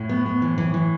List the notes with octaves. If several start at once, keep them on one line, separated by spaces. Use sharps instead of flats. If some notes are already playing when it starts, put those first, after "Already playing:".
Already playing: A2
B3
B3
E3
E3
E3